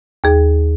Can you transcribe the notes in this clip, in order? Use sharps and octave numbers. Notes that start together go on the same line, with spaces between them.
D#2 G#4